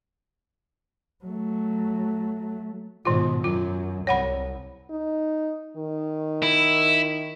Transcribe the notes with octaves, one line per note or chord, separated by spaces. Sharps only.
F#3 A3
G#2 B2 D#3 F4
F#2 F#3 F4
C2 C#5 F#5 B5
D#4
D#3
E4